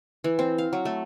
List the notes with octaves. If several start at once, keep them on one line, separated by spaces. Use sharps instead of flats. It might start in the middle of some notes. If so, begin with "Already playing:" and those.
E3
C4
F5
F#3
A3